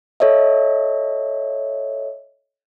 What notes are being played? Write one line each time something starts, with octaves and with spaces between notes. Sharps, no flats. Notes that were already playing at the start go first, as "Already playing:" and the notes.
A4 C#5 D#5 E5